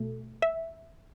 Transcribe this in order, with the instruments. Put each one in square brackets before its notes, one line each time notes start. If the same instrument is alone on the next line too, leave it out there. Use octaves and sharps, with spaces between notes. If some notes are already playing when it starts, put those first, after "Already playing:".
Already playing: [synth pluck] B2 A3
E5